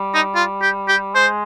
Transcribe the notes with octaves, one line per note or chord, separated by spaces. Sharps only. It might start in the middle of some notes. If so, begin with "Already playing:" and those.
Already playing: G3
D#4
F4
G4
G4
G#3 C5